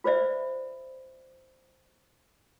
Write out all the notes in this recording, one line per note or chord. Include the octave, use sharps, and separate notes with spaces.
F4 B4 C5 D5 E5